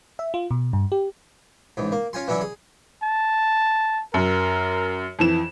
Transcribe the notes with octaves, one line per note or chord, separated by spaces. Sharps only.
E5
F4
B2
G2
G4
A1 G#2
A#3
C#4 F4 G#5 C6
E3 F#3 C#4 D4 E4
G#4
A5
F#2 A#4
F2 E3 E7